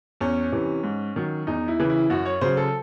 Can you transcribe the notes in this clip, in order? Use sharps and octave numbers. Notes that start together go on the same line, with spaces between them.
E2 C#4
C3 E3
G#2
D#3 F#3
E2 D#4
E4
C#3 E3
E4
F#2 F#4
C#5
C#3 F#3 C5
A4